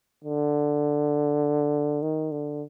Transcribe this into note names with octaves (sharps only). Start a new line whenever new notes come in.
D3
D#3
D3